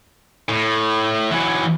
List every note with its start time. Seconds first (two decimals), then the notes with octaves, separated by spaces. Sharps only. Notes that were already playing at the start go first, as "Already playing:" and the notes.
0.49 A2
1.32 E3 F#3